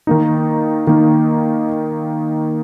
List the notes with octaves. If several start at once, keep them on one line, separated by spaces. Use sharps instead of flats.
D#3 A#3 D#4
D#3 A#3 D#4